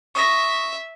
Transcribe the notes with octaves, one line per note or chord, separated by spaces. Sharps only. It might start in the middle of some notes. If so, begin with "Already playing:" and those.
E5 C#6 D#6 A#6